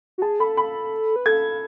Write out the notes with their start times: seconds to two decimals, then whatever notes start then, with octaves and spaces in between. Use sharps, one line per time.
0.18 F#4
0.22 G#4 A5
0.40 A4 B5
0.57 B5
1.16 B4
1.26 A4 G#6